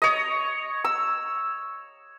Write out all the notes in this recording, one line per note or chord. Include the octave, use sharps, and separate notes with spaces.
C#5 D#5
E6